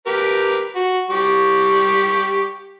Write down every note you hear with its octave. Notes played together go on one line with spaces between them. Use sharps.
G4 A#4 B4
F#4
G3 G4 C#6